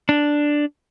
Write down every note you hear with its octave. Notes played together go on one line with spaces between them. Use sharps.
D4